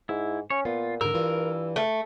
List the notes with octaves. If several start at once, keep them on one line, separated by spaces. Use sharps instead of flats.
G#2 E4
C#4 C#5
A#2 B3 F4
G#2 D3 A#4 E6
G2 E3 F4
A3